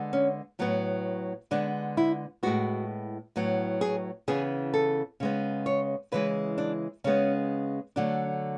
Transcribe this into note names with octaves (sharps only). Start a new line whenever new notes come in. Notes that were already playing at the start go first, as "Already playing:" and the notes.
Already playing: D3 G#3 B3
C#4
A2 F#3 B3
D3 G#3 B3 D4
E4
A2 G#3 B3 F#4
A2 F#3 B3
G#4
C#3 E3 B3 G#4
A4
C#3 G#3 B3
C#5
C#3 E3 G#3 B4
D4
C#3 G#3 B3 C#4
D3 F#3 A3 D4